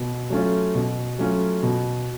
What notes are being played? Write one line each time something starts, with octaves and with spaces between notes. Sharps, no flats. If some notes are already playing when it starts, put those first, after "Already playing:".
Already playing: B2
F#3 A3 C#4 F4
B2
F#3 A3 C#4 F4
B2